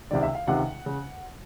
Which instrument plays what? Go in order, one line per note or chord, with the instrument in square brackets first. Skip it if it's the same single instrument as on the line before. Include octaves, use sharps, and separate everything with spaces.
[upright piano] C#2 C3 D#3 D5
E5
F5
C#2 C3 D#3 F#5
C#3